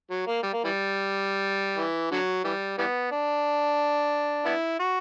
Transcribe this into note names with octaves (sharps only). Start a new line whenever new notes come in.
F#3
A#3
G3
A#3
E3 G3
E3
D3 F#3
E3 G3
E3 G3 B3
D4
B3 E4
F#4